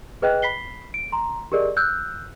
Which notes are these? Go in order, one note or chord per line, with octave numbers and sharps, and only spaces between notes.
G#4 B4 D#5 G5 F#6
B5 B6 C7 G7
D7
A#5 C6
G4 G#4 A#4 D5 D#5
E6 F#6 G6